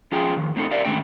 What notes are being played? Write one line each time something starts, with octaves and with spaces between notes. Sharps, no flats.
F3 C#4 F4 G#4 G5
F2 D#3
A2 C4 D#4 F#4 A4
G4 A#4 D5 E5 F5
G#2 D3 D#3 A3 C#4 G5